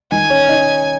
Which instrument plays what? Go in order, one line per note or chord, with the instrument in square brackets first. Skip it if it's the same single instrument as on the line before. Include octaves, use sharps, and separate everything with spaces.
[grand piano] D#3 D#4 [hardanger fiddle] G#5
[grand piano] C#4 C#5
D#4 D#5